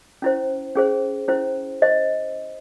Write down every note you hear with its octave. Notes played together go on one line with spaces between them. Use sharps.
C#4 E4 C5
C#4 G#4 C5
C#4 E4 C5
C5 D#5